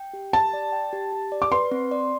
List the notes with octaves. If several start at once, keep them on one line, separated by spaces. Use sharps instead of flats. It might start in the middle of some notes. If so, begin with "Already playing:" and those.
Already playing: G5
G4
G4 A5
D5
G5
G4
G4
D5
D6
B4 C6
C4
D5